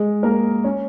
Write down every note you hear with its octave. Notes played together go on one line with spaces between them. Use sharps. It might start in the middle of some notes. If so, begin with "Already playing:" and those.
Already playing: G#3 G#4
A#3 A#4
C#4 C#5